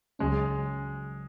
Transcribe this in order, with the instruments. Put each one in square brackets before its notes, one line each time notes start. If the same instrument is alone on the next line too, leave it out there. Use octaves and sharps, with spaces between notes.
[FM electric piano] C#2 C#3 F#3 C#4 [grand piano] G#3